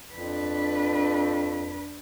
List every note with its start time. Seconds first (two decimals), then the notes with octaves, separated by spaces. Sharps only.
0.14 F2 D4 B4